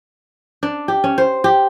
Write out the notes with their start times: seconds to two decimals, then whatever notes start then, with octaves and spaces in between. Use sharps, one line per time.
0.63 D4
0.88 G4
1.04 C#4
1.18 C5
1.44 G4